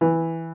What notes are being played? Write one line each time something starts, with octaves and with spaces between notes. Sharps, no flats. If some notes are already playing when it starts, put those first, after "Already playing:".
E3